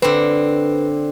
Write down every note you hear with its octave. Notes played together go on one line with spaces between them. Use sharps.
D3 C4 B4